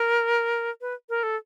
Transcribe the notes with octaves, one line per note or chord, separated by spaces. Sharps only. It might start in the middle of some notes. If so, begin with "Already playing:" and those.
Already playing: A#4
B4
A#4
A4